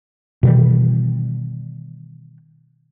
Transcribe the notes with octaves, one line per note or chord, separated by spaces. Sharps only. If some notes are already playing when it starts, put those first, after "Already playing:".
B2 D#3 E3 G3